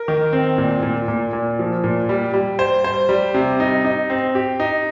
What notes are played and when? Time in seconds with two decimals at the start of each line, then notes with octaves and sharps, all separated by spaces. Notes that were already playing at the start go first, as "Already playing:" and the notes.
Already playing: A#4
0.08 D#3
0.33 C4
0.58 A#2
0.83 A#2
1.08 A#2
1.33 A#2
1.59 F3
1.84 A#2
2.09 G3
2.34 G3
2.59 C5
2.84 C5
3.09 G3
3.34 C3
3.60 D#4
3.85 D#4
4.10 C4
4.35 G4
4.60 D#4